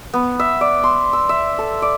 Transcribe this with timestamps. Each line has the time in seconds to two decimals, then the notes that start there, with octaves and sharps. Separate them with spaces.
0.14 B3
0.39 E5
0.61 D5
0.84 C6
1.13 E6
1.29 E5
1.58 A4
1.82 D5